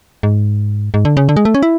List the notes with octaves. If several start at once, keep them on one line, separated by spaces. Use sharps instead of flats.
G#2
G#2
D3
C#3
D3
G#3
A3
C#4
E4